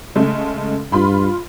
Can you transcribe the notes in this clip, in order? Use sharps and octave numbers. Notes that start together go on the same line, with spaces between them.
C#3 G#3 A3
G2 F4 B5 C6